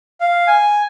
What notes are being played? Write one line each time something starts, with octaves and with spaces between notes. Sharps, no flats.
F5
G#5